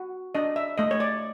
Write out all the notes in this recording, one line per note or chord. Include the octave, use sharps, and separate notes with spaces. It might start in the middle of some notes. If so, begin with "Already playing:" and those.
Already playing: F#4
D4 D#5
E5
A3 D#5
C#5
D5